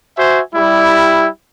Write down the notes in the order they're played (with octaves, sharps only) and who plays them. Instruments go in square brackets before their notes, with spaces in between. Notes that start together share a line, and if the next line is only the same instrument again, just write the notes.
[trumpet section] F#4 C5 E5 G#5
G3 E4